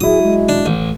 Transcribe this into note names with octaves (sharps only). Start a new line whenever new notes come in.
F#3 E4 G#4 D#6
G#3
D4
A1